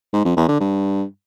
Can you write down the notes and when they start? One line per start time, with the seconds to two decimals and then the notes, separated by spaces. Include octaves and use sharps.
0.13 G#2
0.25 F2
0.37 E2
0.48 D3
0.60 G2